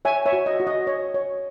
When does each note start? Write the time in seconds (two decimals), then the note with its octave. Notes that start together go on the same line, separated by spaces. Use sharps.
0.05 C#5 E5 G#5
0.26 C#5 E5
0.33 F#4
0.46 D#5
0.60 F#4
0.67 D#5
0.87 C#5
1.14 C#5